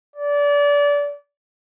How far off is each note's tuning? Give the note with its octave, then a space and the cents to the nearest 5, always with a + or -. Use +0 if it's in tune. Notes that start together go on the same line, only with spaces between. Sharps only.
D5 -25